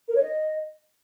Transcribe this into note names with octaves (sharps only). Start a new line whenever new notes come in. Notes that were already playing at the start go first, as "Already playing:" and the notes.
A#4
C#5
D#5